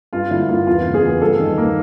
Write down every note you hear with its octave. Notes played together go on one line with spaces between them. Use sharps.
G2 F4
D3 E4
A#3 F4
E2 F4
C#3
G#4
E2
G2 A4
D#3
A#3